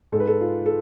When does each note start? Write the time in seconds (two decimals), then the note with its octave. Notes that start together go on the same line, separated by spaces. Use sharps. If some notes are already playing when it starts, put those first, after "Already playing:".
0.12 G#2 A4
0.16 G#3 B4
0.27 A4
0.41 F4
0.66 A4